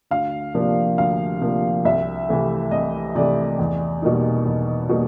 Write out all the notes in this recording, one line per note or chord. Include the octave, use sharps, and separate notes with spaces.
D2 F5
C3 F3 A#3 D4
D2 F5
C3 F3 A#3 D4
C2 E5
C3 E3 A3
C2 D#5
C3 E3 A3 D5
E2
B2 G3 A#3 D#4
E2
B2 G3 A#3 D#4